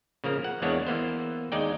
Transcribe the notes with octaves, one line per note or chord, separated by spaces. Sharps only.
C#3 F3 A#3 A#4
F#5
E2 G#3 A#3 B3 D4 C#5
E3 A#3 B3 C5
D#2 G#3 D#4 D5 G5